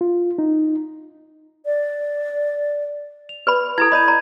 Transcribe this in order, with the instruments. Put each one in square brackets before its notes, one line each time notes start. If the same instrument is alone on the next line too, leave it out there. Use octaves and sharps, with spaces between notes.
[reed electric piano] F4
D#4
[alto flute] D5
[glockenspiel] F7
[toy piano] B4 D5 B5
[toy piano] E4 A4 [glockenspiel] A#5 G#6
[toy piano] D5 D#5 [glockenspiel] B5 G6 D#7
[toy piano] D5 A#5